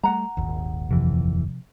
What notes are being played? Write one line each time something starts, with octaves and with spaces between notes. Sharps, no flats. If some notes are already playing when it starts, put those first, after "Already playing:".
G3 A3 F#5 A#5
D#1 G#1 D#2
F2 C3 E3 F3